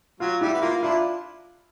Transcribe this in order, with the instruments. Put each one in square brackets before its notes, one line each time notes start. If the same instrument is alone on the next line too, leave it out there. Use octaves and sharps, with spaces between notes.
[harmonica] F#3 [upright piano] F4
[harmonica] G3 [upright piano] E4
[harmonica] B3
[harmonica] A#3 [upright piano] F4
[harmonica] D4 E4 [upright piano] F4